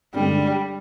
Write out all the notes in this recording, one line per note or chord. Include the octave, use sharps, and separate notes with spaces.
G2 D3 G3 G#3 D4